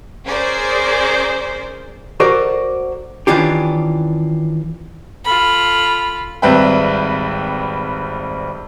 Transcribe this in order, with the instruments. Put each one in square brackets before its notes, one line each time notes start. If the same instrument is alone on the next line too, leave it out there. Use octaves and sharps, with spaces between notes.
[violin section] C#4 G#4 A#4 C5 D5
[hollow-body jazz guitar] F#4 A4 A#4 C5 D5
D#3 E3 C#4 D4 F4 G4
[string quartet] F4 A4 B5
[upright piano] G#1 G3 C4 B4 E5 G5